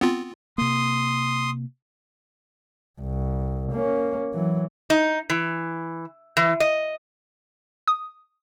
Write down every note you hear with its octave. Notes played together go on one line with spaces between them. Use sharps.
B3 C4 F4
C3 A#3 C6 D#6
C2
A#3 C#4
E3 F#3
D#4
E3
E3
D#5
D#6